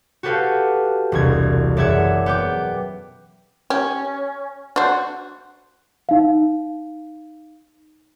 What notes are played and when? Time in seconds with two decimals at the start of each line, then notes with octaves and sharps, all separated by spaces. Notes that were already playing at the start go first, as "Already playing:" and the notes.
0.23 F#4 G4 A4 B4 F5 G5
1.12 E1 C2 G#6
1.77 F#1 D5 E5 F#5 G#6
2.26 B3 G5 D6
3.70 C#4 G4
4.76 D4 F#4 C5
6.09 D#4 F5